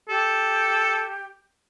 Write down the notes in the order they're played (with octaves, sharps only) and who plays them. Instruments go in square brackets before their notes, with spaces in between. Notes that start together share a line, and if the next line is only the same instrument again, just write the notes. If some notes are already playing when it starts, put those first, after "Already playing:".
[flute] G4 [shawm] A4